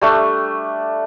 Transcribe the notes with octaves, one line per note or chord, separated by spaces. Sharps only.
G3 A3 D4